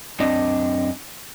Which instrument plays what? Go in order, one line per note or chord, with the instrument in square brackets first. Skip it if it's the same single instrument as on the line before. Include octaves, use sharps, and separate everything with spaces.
[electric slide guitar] F#2 C4 D4 D#5